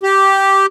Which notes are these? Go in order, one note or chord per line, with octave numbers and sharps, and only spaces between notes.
G4